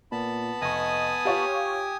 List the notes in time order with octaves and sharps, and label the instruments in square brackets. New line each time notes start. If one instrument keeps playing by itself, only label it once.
[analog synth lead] A#2 [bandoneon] B3 A5 B5
[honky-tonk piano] F1 C#6 [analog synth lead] D#5 [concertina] G#5 D#6
[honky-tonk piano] F4 C#5 F5 [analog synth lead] G4